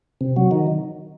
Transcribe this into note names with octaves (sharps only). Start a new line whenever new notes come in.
C3
F#3
D#3